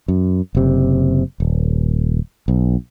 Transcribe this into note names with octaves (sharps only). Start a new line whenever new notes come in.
F#2
F#1 C3
D#1
B1